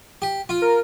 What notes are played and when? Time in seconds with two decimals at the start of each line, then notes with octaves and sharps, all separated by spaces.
0.22 G4
0.49 F4
0.62 A#4